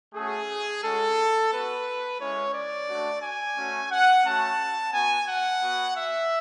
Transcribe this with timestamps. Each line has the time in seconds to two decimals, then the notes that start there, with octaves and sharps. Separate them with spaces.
0.14 A3 C#4 F#4 G#4
0.83 G#3 C#4 F#4 A4
1.51 B3 F#4 B4
2.19 G#3 C#4 E4 C#5
2.54 D5
2.88 A3 D4 F#4
3.22 G#5
3.57 A3 C#4 F#4
3.92 F#5
4.25 A3 C#4 F#4 A5
4.93 B3 F#4 G#5
5.28 F#5
5.62 B3 F#4
5.96 E5